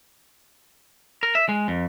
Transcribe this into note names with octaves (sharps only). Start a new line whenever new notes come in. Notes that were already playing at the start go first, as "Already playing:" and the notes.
A#4
E5
G#3
F2